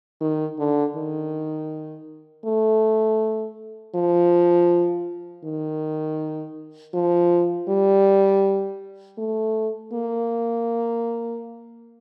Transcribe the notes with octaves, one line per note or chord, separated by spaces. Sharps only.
D#3
D3
D#3
A3
F3
D#3
F3
G3
A3
A#3